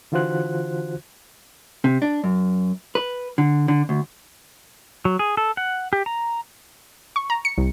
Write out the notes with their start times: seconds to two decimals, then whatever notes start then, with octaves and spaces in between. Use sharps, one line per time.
0.12 D3 E3 F4 F#4 C5 F#6
1.84 C3
2.02 D4
2.24 F#2
2.95 B4
3.38 D3
3.68 D3
3.89 D2
5.05 F#3
5.19 G#4
5.37 A4
5.57 F#5
5.93 G4
6.06 A#5
7.16 C#6
7.30 A#5
7.45 C#7
7.58 C2